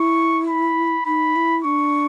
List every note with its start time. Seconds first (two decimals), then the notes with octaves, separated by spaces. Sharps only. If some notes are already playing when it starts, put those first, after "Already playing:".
Already playing: E4 C#6
0.48 B5
1.06 D#4 B5
1.36 E4
1.64 D4 C#6